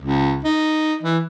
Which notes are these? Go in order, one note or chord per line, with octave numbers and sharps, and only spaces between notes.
C#2
D#4
E3